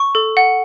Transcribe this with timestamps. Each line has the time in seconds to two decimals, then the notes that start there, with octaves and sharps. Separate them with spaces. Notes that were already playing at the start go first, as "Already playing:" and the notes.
Already playing: C#6
0.15 A4
0.37 F#5